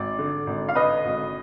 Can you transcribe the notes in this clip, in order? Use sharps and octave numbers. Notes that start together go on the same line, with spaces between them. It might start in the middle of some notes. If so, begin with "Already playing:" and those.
Already playing: G#1 D5
D3
G#1
F5
D3 B4 D#5
G#1